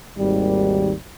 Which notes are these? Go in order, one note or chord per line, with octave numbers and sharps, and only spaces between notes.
G#1 D#2 G3